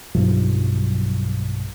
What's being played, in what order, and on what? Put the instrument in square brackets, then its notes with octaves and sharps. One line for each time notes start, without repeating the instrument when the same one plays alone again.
[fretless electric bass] B1 G2 F3 F#3